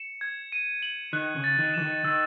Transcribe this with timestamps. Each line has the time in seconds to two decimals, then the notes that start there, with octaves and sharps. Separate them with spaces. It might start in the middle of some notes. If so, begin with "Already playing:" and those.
Already playing: C#7 E7
0.21 G#6
0.52 D#7
0.83 F#7
1.13 D#3 F#6
1.36 C#3
1.44 A6
1.59 D#3
1.74 E3 E7
1.82 D#3
2.04 D#3 E6